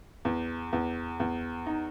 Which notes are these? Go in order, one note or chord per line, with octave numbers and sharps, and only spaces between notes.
E2
E2
E2
D#4